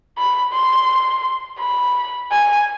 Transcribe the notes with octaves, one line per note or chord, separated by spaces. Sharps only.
B5
C6
B5
G#5